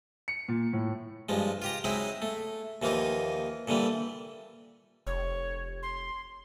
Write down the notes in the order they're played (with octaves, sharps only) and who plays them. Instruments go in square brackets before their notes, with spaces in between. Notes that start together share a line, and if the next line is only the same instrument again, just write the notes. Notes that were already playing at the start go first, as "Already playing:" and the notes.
[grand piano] C#7
A#2
A2
[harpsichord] G2 F3 G#3
F4 G4 A#5
F#3 G#3 C4 D#4 E4
A3
D#2 E3 F3 A#3 D#4
A#2 D3 E3 G3
[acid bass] F1 [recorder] C#5
[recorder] C6